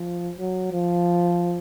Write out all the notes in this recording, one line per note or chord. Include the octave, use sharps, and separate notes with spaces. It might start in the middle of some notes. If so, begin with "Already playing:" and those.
Already playing: F3
F#3
F3